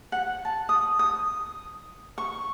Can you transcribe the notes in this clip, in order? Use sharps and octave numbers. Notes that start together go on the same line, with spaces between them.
F#5
A5
D#6
D#6
C#6